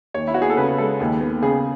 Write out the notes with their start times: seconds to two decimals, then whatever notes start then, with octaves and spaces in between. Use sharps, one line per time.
0.14 D#2 C#5
0.27 E4
0.34 B3 F#4
0.42 G#4
0.50 A4
0.57 C#3 B4
0.78 G#3 A4
1.00 D#2
1.21 B3
1.42 C#3 G#4